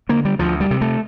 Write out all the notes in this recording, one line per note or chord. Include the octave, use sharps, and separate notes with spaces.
D3 A#3
G3
D2 F3
G3
C3
A3